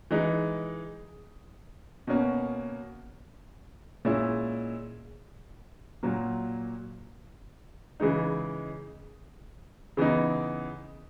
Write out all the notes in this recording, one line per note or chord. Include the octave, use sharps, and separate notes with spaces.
E3 G#3 D#4
B2 A#3 C#4
A#2 G#3 C#4 E4
A#2 F#3 A#3
C#3 E3 G#3 D#4
C#3 E3 B3 D#4